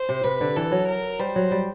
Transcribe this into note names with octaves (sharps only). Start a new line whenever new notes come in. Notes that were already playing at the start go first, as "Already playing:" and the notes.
Already playing: C5
C3
C3 B4
D3
E3 A4
F#3
A#4
G3 C5
F#3
G3